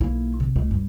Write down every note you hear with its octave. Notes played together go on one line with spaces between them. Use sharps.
B1 A#3 E4
C3
C#2 A3
G2